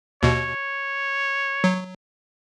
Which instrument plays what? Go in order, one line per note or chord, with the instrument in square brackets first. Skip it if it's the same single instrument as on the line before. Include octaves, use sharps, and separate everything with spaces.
[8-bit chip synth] D#2 B2 [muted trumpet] C#5
[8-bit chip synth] F#3